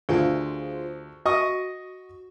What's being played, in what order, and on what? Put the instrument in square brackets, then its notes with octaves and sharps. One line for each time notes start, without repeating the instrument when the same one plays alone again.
[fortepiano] D2 [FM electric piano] F4 G#4 C5
[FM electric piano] F#4 [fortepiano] D#5 C#6 D#6